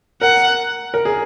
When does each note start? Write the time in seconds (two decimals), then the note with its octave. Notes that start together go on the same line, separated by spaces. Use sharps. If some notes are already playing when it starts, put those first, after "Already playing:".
0.21 A#4 F#5
0.94 A#4
1.05 G#4